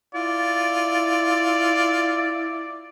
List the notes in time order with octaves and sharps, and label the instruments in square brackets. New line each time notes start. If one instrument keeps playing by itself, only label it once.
[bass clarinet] E4 [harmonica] F4 [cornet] D5